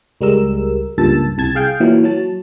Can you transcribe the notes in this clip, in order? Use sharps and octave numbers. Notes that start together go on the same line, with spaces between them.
C#2 G3 G#3 A#4 E6
C#2 G2 A#2 A5 E6
C2 A5 G#6
G#4 F5 G5
A#2 E3 F#3
F#3 A5